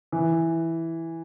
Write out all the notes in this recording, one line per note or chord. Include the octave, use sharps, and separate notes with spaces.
E3